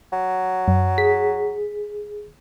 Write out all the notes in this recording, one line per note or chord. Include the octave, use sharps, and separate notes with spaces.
F#3
F#2
G#4 B6